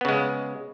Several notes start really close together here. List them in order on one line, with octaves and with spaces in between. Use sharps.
B3 C#3 G#3